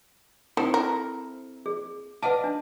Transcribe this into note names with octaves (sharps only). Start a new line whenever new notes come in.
D#3 C4 E4 A4
A#4
G#4
B4 D5 D#5 F5 F#5 A5
D4